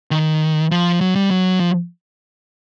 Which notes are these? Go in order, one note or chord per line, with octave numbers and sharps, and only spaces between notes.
D#3
F3
F#3
G3
F#3
F3